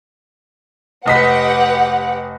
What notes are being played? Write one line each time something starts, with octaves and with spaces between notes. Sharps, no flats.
F1 G4 B4 D#5 F#5 B6